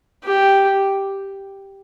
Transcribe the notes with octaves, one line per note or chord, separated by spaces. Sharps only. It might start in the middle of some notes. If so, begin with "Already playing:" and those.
G4